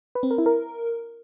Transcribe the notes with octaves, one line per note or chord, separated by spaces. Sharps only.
B4
C4
A#4
E4
A#4